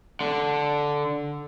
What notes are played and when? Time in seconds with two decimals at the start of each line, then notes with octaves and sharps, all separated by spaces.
0.21 D3